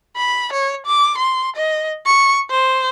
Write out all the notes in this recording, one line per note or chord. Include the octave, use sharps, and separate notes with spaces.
B5
C#5
D6
C6
D#5
C#6
C5